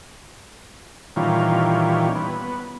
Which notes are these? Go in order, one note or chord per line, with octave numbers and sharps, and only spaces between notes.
A#2 D#3 E3 G3 C#4 F4
B3